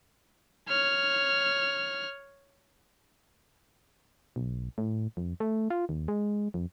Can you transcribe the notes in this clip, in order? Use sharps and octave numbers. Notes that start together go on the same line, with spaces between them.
C#5 F6
B1
A2
F2
A3
F4
D#2
G#3
F2